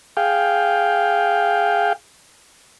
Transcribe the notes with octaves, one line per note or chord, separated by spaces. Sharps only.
G#4 F5 G5